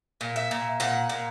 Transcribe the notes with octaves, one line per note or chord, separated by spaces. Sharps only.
A#2
E5
A#2
A#2 F#5
A#2